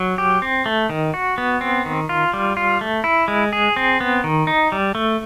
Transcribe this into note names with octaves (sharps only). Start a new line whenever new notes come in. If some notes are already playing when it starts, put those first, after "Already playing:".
Already playing: F#3
G4
C4
A3
D#3
F#4
B3
C4
D#3
F4
G3
F4
A3
E4
G#3
G#4
C4
B3
D#3
D#4
G3
A3